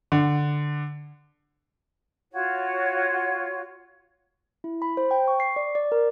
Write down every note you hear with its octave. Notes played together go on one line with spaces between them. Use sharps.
D3
F4 F#4 C#5
E4
B5
C5
G5
C#6
C7
D5
D5
A#4